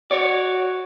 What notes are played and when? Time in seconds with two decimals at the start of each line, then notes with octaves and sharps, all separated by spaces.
0.11 F#4 C#5 D5